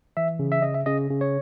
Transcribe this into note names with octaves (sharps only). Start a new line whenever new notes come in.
E3 E5
C#3
E5
C#3 D#5
E5
C#3 D#5
C#3
C#5